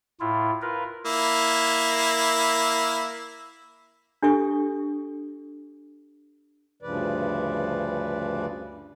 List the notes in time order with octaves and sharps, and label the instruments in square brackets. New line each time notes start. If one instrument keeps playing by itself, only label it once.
[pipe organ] A2 E4 F4
F4 A#4 B4
[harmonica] A#3 E4
[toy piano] D4 G4 A4 C#6 D#6
[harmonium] D2 G2 C#3 F3 B4 D5